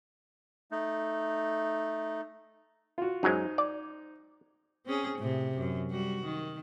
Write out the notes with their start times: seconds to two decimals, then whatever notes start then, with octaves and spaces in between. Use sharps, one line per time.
0.71 A3 D#4
2.98 F4 F#4
3.23 F#2 F#3 G#3 D#4 C5
3.58 D5
4.86 C4 C#4 G#4
5.18 A2 C3
5.57 F#2
5.91 G3 F#4
6.25 D#3